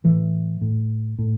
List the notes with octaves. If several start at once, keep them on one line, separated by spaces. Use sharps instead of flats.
A2 E3
A2
A2